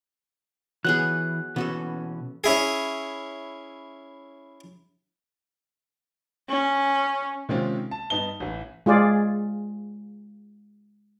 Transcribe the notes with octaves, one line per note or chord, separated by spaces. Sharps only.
E3 F#3 B3 G#4 F#6
B2 E3 B3 C#4 F#4 A4
C#4 E4 G#4
C#4
C3 D#3 G#3 C4 C#4 F4
A5
G2 B3 D#4 A5 G7
A1 E3
G#3 F4 G#4 D5